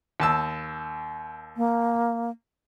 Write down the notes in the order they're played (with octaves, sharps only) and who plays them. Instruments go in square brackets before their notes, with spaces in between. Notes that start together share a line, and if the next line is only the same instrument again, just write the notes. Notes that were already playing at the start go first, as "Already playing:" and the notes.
[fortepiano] D#2 A5 E6
[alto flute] A#3